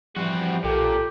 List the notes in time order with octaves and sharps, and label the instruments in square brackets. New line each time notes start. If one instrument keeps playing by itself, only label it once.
[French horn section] E3 G3 G4 [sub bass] F3 [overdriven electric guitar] C4 F#4
[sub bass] B1 [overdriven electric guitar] A#2 [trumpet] G4 [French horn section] A4